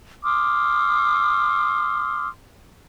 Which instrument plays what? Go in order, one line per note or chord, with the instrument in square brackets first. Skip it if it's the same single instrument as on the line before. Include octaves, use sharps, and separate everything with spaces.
[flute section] C6 D6 D#6 F6